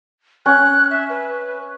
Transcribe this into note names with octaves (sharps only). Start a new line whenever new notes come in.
C#4 F#6
E5
B4